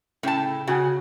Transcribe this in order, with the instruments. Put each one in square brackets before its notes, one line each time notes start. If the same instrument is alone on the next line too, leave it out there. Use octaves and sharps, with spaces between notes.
[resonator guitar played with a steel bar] A2 A5 [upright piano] C#3 G5
[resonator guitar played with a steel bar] C#3 [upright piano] F#4 F#5 G#5